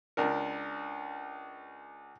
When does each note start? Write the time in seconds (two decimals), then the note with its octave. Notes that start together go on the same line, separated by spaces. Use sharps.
0.17 C#2 D4 A#4